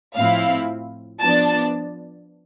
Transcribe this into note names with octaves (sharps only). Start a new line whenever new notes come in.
A2 F3 C4 E4 F5
F3 B3 D4 A5